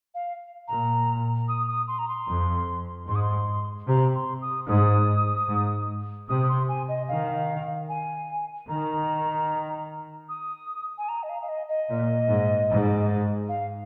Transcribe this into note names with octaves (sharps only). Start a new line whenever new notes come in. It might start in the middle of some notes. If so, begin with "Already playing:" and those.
F5
A#2 A#5
D#6
D#6
C6
A#5
C6
F2
G#2 C6
D#6
C6
C3 A#5
C6
D#6
G#2 D#6
G#2
C3 D#6
C6
G#5
D#5
D#3 F5
G#5
D#3 A#5
D#6
G#5
A#5
D#5
F5
F5
D#5
D#5
A#2
G#2
G#2
F5